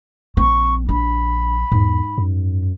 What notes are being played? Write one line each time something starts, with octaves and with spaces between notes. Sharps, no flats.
A#1 C4 C#6
D4 B5
E2 G#2
F#2